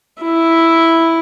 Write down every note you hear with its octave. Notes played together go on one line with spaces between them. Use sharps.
E4